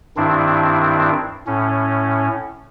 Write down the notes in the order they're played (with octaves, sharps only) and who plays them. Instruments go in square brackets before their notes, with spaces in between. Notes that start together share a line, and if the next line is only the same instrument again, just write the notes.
[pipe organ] G2 D#3 C4 D4 E4
A2 C#4